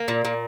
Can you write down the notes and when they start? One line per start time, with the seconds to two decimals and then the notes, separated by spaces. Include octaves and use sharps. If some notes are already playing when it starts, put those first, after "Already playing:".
Already playing: A#3
0.08 A#2
0.25 A#2